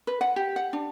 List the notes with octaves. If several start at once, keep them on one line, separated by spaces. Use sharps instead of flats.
B4
F#5
G4
F#5
D4